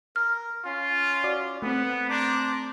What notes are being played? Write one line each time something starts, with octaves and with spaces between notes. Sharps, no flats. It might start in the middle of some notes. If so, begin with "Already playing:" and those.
A#4 F6
C#4 F4
F#4 D5 D6
A3 B3 C4 B4
D4 C5 A#5 D6